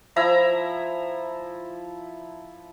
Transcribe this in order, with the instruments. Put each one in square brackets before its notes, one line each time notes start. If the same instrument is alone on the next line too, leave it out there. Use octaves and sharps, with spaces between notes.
[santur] F3 E4 E5 A#5